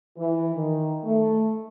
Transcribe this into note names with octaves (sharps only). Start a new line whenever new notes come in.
E3
D#3
A3